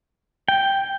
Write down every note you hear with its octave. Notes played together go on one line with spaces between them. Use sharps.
G5